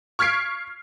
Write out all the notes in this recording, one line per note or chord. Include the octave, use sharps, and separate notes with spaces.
C#6 F6 G#6 B6 C7 D7